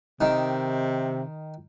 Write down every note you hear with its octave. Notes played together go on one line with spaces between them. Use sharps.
C3 D#3